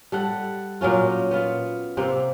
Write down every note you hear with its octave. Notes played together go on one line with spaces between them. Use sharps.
G3 A4 F#5
A#2 F#3 C#4 F4
B3 F4
C3 A#3 C4